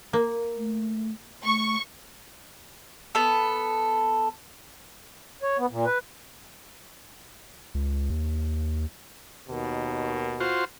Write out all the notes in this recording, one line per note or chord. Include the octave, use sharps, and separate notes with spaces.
A#3
A3
A3 C#6
B3 A4
C#5
B3
A#2
B4
C#2
D#2
D#2 B2 D#3
F4 F#4 C5